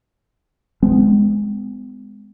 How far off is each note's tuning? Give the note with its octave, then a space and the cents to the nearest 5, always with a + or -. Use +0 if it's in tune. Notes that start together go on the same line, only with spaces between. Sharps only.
G#3 +0 B3 +45